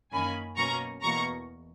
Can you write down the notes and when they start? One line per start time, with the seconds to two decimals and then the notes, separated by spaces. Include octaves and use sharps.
0.12 F#2 D#3 A#3 C#4 G#5 B5
0.57 B2 F#3 A#3 C#4 A#5 C#6
1.02 E2 B2 A#3 A#5 C#6